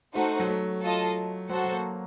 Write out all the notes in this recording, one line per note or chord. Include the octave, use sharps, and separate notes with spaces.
A3 D#4 F#4 A4 C5 F#5
F#3
A3
F4 A4 D#5 A5
F#3 F#4 A4 C5 F#5
F#3
A#3